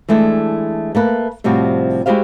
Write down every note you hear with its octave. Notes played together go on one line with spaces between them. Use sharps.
E3 G#3 A3 D4 E4
A3 A#3 B4
A2 C3 F3 G3 F#4
G#3 E4 F#4 G4 C5 F5